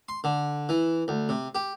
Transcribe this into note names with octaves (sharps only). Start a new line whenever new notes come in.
C6
D3
E3
D2
C3
G4